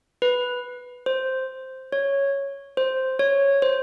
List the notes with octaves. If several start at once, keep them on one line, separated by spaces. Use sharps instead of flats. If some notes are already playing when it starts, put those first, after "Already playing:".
B4
C5
C#5
C5
C#5
C5